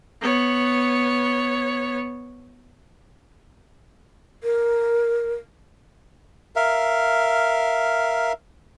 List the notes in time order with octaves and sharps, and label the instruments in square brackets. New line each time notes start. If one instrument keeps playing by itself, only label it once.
[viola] B3 C#5
[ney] A#4
[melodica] A#4 E5 F5